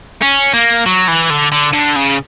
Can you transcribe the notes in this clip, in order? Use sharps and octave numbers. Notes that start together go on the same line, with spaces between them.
C#4
A#3
F#3
E3
D3
D3
D3
C#3